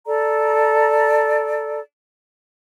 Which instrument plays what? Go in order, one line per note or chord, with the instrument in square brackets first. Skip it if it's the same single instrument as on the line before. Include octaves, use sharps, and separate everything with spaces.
[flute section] A4 D5 A#5